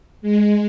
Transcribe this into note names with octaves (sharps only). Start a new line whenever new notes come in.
G#3